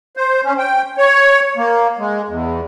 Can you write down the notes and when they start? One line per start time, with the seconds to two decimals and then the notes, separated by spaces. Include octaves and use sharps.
0.17 C5
0.45 C#4
0.58 G5
0.98 C#5
1.57 A#3
1.99 G#3
2.29 E2